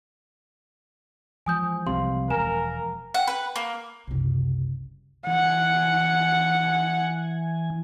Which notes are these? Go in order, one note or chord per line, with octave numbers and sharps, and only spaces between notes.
E3 F3 G#3 G#5 D#6 G6
C2 C3 F5 C6
E1 A#4 G#5 E7
F#5
B4
A#3
F#1 C2
E3 F#5 G#5